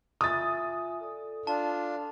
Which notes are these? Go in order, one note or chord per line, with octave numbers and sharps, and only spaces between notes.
F4 E5 G#5 D#6 A6
A4 D5
D4 F4 A5